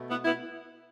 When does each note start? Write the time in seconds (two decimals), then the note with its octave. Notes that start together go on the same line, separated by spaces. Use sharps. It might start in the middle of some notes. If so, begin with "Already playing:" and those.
Already playing: B2 A3
0.09 B3 E4
0.24 B3 E4